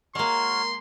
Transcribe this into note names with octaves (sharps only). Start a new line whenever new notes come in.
G#3 A#3 F#4 A#4 C#5 C6